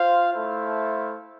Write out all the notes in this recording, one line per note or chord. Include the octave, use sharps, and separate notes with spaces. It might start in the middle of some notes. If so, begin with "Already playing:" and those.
Already playing: F4 C5 F5
A3 E4 A4 C5 F5